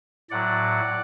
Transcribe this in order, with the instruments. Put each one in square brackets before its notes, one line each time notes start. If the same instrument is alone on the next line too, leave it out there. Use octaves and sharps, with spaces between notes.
[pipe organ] A2 F#3 D5 F#5